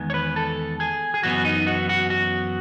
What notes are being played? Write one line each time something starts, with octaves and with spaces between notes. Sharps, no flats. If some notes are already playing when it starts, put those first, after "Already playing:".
Already playing: E2 D#3 G#3 B3
C#5
B4
A4
G#4
G#4
F#2 E3 B3 F#4
D#4
F#4
F#4
F#4